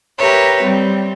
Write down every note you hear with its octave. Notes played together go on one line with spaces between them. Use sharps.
G4 A#4 B4 C#5 E5
G3 C4